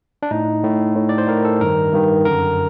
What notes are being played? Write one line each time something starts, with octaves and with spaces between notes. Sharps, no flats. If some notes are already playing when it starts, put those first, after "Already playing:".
D4
A2 D#4
A2
A2
D5
C5
A2 A#4
A4
G2 D#3 A#4
G2 D#3
F#2 D3 A#4